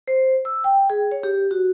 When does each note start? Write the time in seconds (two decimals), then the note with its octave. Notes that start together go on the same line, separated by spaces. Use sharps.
0.08 C5
0.45 E6
0.64 G5
0.90 G#4
1.12 C#5
1.23 G4
1.51 F#4